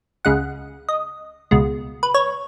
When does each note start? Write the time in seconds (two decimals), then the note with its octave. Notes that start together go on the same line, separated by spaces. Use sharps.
0.25 C#2 C#3 G#3 F#5
0.89 D#5
1.51 C#2 B2 G#3
2.03 B4
2.14 C#5